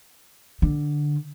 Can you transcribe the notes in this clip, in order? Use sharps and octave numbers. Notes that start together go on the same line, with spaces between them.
D3